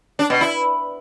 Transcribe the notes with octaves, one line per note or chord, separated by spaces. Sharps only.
D4
B2
E4